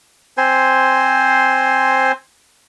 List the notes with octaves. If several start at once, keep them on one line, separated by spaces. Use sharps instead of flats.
C4 C5 G#5 C6